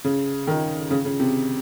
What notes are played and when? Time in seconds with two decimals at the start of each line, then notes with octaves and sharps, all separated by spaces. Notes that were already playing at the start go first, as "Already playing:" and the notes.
0.04 C#3
0.47 D#3
0.90 C#3
1.05 C#3
1.20 C3